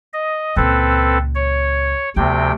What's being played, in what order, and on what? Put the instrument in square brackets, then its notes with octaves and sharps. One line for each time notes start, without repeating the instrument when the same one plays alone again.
[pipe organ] D#5
[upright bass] C#2 A#2 [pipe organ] C4 A4 B4
[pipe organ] C#5
[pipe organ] D2 C3 G5 [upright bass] F3 B3